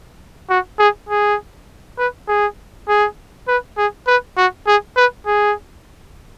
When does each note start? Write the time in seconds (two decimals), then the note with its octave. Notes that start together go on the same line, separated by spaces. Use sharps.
0.50 F#4
0.79 G#4
1.09 G#4
1.98 B4
2.28 G#4
2.88 G#4
3.48 B4
3.77 G#4
4.07 B4
4.37 F#4
4.67 G#4
4.96 B4
5.26 G#4